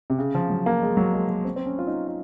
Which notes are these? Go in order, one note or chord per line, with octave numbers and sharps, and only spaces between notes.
C3
C#3
F3
F#3
A#3
G#3
F#3
G#3
A#3
C4
C4
C#4
F4
D#4
F4